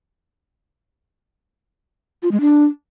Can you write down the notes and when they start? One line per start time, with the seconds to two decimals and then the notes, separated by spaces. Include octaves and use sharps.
2.23 F4
2.32 G#3
2.41 D4